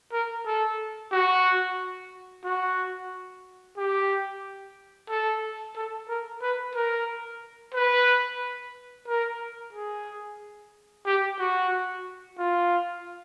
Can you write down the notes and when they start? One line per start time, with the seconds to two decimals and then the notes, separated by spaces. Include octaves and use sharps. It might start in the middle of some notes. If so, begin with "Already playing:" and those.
0.12 A#4
0.45 A4
1.12 F#4
2.44 F#4
3.77 G4
5.09 A4
5.76 A4
6.08 A#4
6.42 B4
6.75 A#4
7.74 B4
9.07 A#4
9.73 G#4
11.06 G4
11.38 F#4
12.38 F4